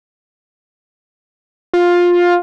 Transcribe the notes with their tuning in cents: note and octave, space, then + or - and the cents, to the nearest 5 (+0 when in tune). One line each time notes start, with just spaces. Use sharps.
F4 +10